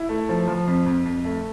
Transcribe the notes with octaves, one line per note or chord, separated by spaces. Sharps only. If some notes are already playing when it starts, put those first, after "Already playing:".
Already playing: E4
A3
F3
F3
F2
F2
F2
A3